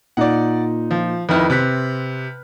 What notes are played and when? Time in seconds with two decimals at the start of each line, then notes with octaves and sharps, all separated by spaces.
0.17 A#2 D#4 D5 F#5
0.91 F3
1.29 F2 D#3 E4 B4 F6
1.50 C3 F#6 B6